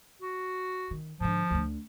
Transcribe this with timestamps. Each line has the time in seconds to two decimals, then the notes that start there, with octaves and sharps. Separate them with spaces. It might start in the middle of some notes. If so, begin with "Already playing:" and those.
0.22 F#4
0.91 D#3
1.20 G#2 D3 F3
1.50 D2 D3